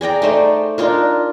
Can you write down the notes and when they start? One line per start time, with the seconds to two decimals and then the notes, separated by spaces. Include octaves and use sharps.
0.01 G#4 D5 G5 A#5
0.22 A3 D#4 C5 D5
0.78 D4 D#4 F4 A#4